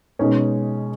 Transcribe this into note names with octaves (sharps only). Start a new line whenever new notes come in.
B2 G#3 C#4 D#4